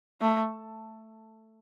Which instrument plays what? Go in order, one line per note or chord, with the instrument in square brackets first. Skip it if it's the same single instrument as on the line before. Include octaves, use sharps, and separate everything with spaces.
[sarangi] A3